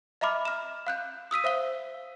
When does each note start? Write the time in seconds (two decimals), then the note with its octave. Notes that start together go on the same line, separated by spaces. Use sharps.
0.21 D#5 E5 A#5 B5 D6 F6
0.45 F6 E7
0.87 F5 F#6 G6
1.31 D#6 E6 B6 D#7
1.44 C5 E5 F5 G7